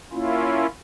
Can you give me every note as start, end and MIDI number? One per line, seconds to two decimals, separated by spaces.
0.12 0.67 58
0.12 0.67 61
0.12 0.67 64
0.12 0.67 65